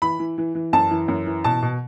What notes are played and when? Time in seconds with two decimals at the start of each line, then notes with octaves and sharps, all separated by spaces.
0.02 E3 B5
0.19 E3
0.38 E3
0.55 E3
0.73 F#2 A5
0.91 E3
1.08 F#2
1.26 E3
1.44 B2 A5
1.62 B2